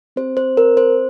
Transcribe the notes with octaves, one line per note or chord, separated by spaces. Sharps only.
C4 G4 C5
C5
A#4
C5